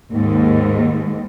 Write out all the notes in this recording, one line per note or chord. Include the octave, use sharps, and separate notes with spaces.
D#2 G#2